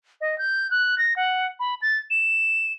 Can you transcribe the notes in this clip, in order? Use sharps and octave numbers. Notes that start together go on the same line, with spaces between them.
D#5
G6
F#6
A#6
F#5
B5
A6
E7